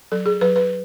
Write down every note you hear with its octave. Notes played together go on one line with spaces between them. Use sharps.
F#3 A4
G#4
F#3 B4
B4